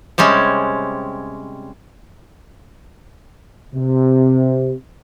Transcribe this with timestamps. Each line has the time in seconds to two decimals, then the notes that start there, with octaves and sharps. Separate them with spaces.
0.18 C3 G3 G#3 C#4
3.74 C3